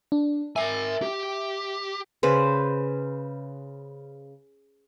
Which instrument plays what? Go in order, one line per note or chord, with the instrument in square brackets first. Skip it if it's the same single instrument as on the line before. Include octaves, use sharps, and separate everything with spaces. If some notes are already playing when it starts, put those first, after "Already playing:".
[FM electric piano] D4
[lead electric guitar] A#4 G#5 [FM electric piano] E5
[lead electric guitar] G4
[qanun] C#3 B4 C5